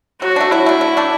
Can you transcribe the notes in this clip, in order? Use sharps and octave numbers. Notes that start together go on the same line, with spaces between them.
F#3 F#4
A3 D4
F#3 E4
A3 D4
D3
A3 D4